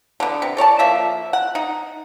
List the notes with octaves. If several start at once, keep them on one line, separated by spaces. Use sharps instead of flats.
D3 B3
C3
A4 C#5 D5 A5
F3 A#3 E5
F#5
D#4